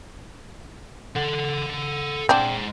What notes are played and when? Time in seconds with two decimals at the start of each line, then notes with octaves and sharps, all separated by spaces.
1.16 A4 F#5
2.29 G#3 C4 D4 F#5